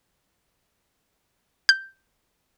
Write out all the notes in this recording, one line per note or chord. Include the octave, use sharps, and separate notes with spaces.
G6